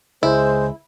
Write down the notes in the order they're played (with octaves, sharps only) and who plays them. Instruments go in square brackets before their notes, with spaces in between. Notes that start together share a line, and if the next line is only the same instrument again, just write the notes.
[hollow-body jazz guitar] C#2 [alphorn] G#3 [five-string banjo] E4 [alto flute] C5